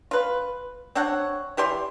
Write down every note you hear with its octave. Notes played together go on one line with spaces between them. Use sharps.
F4 B4
C4 D4 C#5 F#5
E3 G4 D5 C6